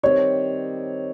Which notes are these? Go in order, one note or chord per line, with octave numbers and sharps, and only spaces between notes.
D#3 G3 C4 C#5